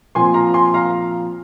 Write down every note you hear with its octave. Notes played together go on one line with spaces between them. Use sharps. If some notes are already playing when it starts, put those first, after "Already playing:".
A#2 F3 C4 G#5 C6
F5 A#5
G#5 C6
F5 A#5